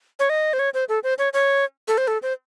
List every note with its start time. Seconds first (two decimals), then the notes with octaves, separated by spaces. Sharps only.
0.19 C#5
0.30 D#5
0.53 C5
0.59 C#5
0.74 C5
0.89 A4
1.04 C5
1.19 C#5
1.33 C#5
1.88 A4
1.98 C5
2.08 A4
2.23 C5